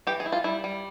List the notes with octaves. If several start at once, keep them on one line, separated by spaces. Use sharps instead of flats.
E3 G4
G#4
E4
F4
G3 E4
G3